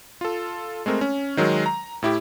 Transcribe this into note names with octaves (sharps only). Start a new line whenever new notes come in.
F4 A4
G#3 A3 C4 A#4
C#4
D#3 F#3 G#3 A#4
A#5
A2 E4 G4